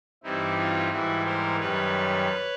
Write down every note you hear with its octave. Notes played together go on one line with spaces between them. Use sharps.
G2 E3 G3 C4 D#4 E4
F4
G#2 E3 G3 E4 F#4
A#4 C5
F#2 D#3 G3 B4 C#5